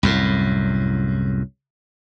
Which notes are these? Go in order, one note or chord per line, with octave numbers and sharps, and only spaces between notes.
C2 F#2 A2